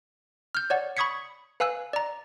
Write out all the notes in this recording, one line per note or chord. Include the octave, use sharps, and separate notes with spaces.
F6 G6
C#5 D5 F#5
B5 C#6 D#6 G#6 B6 C#7
B4 F5 G#5 E6 F#6
D5 A#5